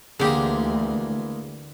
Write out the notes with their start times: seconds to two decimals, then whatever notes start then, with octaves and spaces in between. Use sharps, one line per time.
0.20 D2 D3 E3 G#3 A#3 G4 G#4